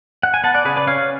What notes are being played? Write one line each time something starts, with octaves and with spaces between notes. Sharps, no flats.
F#5
G#5
B3 F#5 A5
D5 F#5
C#3 G#4 B4
B4 D5
C#4 C#5 F5